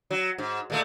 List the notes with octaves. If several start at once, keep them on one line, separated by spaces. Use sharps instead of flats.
F#3
G#2
A#2 G#3 A3